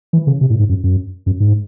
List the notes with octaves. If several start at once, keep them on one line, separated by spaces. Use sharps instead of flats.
E3
C#3
C3
A2
G#2
F#2
F#2
F#2
G#2